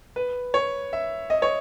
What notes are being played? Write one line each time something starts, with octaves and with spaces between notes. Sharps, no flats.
B4
C#5
E5
D#5
C#5